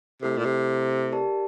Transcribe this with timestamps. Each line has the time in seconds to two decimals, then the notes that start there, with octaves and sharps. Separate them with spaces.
0.22 C3 A3 E4 A4
0.38 A#2
0.45 C3
1.12 G4 A#4 D5 A5